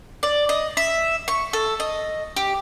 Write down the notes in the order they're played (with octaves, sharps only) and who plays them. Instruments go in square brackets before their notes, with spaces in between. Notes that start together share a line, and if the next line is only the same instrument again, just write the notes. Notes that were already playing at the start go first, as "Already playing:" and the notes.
[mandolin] D5
D#5
E5
C#6
A4
D#5
G4